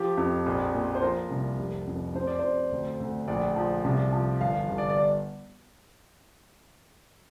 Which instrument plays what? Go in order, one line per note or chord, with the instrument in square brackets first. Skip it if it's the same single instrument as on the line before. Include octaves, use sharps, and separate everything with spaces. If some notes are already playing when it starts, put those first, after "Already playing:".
Already playing: [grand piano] F3 G4
F2
A#1
A#2
C5
F3 A#4
C2
F1
F2
F2 C5
D5
F2 C5
D2
D2
A#1 D5
F3
C2
F3
G1 F5
G1
D5
D5